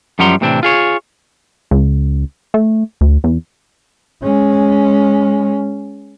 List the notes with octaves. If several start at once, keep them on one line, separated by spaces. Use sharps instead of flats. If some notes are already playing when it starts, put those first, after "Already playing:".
F#2 F3 G3 F#5 A#5 C6
A2 C3 E3 C4 D4
F4 G#4 C#5
C#2
A3
D2
E2
G#3 C#4